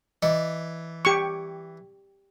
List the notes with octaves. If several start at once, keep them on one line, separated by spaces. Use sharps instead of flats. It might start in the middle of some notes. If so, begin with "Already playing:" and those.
E3 D5 D#5
G4 C#6